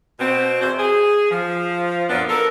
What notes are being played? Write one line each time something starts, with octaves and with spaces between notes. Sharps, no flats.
B2 C4
E2 F#4 C5
G#4
F3
F#2 A#2 F3 B3 D4
A4 A#4